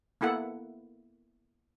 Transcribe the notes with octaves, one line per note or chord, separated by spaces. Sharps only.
A#3 B3 E4 A4 F#5